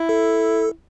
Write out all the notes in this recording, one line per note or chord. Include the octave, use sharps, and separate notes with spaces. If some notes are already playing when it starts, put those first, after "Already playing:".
Already playing: E4
A4